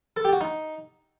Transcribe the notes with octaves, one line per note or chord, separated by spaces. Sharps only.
A4
G4
F#4
D#4